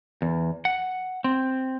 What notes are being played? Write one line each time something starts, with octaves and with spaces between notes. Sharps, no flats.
E2
F#5
C4